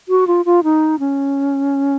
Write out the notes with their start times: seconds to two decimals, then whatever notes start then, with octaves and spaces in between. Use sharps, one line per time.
0.09 F#4
0.27 F4
0.45 F4
0.64 D#4
0.99 C#4